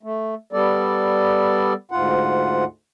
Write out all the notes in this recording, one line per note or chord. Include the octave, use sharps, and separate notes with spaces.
A3
G3 B3 A4 D5
D2 G#2 F4 F#5